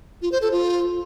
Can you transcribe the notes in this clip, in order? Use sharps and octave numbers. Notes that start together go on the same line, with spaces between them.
F4
C5
A4
F4